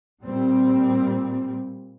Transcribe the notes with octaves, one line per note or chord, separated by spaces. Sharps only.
A#2 G3 C4